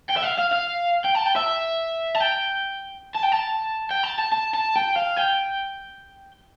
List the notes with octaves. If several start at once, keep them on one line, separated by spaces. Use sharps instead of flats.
G5
E5
F5
F5
F5
G5
A5
G5
E5
A5
G5
A5
G5
A5
G5
A5
A5
A5
A5
G5
F5
G5